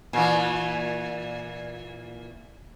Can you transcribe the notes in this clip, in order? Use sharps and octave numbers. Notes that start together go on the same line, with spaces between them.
A#2 E3